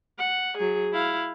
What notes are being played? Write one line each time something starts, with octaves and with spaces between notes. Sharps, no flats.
F#5
F#3 G#4
E4 F5